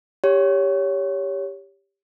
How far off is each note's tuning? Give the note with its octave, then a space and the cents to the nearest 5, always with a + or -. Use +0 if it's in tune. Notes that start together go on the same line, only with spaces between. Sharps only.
G4 +10 C#5 +15